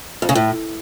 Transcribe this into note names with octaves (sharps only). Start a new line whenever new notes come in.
F2
C#3
A2